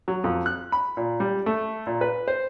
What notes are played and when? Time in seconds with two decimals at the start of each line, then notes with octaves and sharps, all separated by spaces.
0.08 F#3
0.24 F2
0.46 F#6
0.72 B5
0.97 A#2
1.20 G3
1.46 A3
1.87 A#2
2.01 B4
2.28 C5